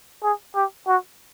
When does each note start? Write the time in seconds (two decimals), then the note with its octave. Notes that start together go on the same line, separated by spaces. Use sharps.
0.23 G#4
0.55 G4
0.87 F#4